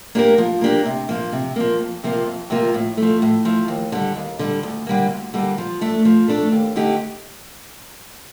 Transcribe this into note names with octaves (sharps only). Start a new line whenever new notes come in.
A#3 D4 G4 A#4
F3
A#3 D4 G4 A#4
C3
F3 A#3
C3
F3 A#3
F2
C3 F3 A#3 F4
F2
C3 F3 A#3 F4
A2
F3 A3
A2
F3 A3
D#2
D3 G3
D#2
D3 G3
D2
D3 G3 A#3
D2
D3 G3 A#3
F3
A3 D4 A4
F3
A3 D4 A4
D#2
D3 A3 D#4 G4